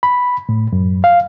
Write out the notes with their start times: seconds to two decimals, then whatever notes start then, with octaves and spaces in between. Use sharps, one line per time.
0.03 B5
0.49 A2
0.73 F#2
1.04 F5